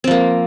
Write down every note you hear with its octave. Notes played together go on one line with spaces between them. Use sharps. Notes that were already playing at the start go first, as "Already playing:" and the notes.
F3 A#3 C4